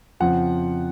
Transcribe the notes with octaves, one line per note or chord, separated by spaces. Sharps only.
F2 C#3 F3 F#5